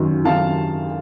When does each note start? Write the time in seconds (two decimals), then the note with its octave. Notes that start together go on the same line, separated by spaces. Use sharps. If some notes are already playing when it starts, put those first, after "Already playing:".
Already playing: F#2 D#3
0.25 F#2 D#3 F5 A5